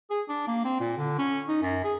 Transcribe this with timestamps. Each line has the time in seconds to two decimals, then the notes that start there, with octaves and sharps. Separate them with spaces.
0.10 G#4
0.29 D4
0.47 A#3
0.65 C4
0.80 A#2
0.97 D3
1.18 C#4
1.48 D#4
1.62 F#2
1.84 G#4